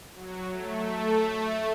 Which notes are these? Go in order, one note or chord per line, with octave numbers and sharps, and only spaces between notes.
F#3
A3